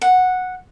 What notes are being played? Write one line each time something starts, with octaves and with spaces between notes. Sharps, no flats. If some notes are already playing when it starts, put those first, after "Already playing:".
F#5